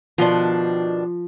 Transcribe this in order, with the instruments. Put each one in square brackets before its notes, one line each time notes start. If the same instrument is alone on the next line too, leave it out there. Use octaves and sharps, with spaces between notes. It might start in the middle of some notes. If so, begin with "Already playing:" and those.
[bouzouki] B2 D#3 D4 [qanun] F3 C6